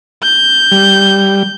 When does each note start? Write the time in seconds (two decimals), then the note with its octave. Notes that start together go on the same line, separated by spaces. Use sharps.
0.23 G6
0.72 G3